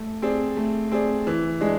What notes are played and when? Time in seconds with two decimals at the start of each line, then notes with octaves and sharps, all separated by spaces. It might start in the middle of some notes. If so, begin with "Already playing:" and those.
Already playing: A3
0.22 C4 G#4 D5
0.57 A3
0.91 C4 G#4 D5
1.27 E3
1.61 G#3 D4 G#4